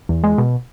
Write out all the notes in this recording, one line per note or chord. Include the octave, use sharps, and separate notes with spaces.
E2
G#3
B2